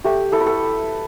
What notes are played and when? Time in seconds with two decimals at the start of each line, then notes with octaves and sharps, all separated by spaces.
0.04 A3 G4
0.32 E4 A4
0.40 B4
0.47 A4